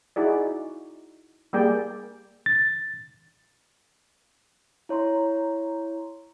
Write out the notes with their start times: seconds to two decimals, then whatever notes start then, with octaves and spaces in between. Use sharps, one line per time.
0.16 D#4 E4 F#4 G#4 D5
1.53 G3 A#3 G#4 D5 G5
2.46 A6
4.89 E4 C#5 A#5 C6